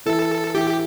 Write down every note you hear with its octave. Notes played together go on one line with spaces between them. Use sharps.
E3 E4 A4
E3 E4 G4